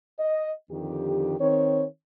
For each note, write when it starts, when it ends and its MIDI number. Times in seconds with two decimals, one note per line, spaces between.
0.19 0.51 75
0.70 1.36 41
0.70 1.36 50
0.70 1.36 51
0.70 1.36 67
1.39 1.84 51
1.39 1.84 60
1.39 1.84 73